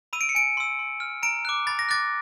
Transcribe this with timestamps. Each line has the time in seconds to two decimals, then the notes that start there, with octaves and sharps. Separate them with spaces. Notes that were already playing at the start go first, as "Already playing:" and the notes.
0.13 B5 E6 D#7
0.21 D7
0.29 C#7
0.35 G#5 D7
0.57 C6 E6
0.79 C6
1.00 F6
1.23 A#5 D7
1.45 D6 F#6
1.67 B5 A6
1.79 A#6
1.89 D6 F#6 A6